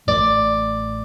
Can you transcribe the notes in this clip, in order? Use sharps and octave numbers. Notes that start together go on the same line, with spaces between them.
A1 A2 A3 D5